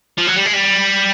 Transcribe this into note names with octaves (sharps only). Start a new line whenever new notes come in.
F3
F#3
G3
G#3
G3